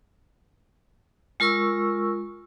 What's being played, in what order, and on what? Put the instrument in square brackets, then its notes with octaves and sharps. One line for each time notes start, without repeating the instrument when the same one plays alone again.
[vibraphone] G#3 F4 A#4 C#6 E6